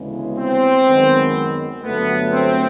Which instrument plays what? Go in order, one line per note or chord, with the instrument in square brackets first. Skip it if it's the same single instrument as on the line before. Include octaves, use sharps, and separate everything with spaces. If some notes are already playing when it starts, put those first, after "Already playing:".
Already playing: [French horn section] D2 C#3 E3 G#3 B3
[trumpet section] C4
[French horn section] F#2 D#3 G#3 B3
[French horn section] G2 D3 F#3 A3 [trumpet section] B3
[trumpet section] C4